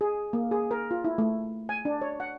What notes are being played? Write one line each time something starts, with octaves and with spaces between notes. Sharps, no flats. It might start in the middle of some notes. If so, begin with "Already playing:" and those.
G#4
A#3
G#4
A#4
F4
E4
A3
G#5
D4
C#5
F#5